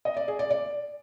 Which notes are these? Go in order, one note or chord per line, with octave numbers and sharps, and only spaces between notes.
D#5
D5
G#4
D5
D5